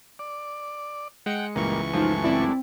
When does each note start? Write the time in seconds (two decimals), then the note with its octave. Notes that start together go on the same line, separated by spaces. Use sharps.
0.19 D5
1.26 G#3 F#5 G5 C#7
1.56 C#2 G2 A#2 E3 A#3 C#6
1.93 F#2 F3 G#3 A3 D#4
2.23 G1 C4 E4 D5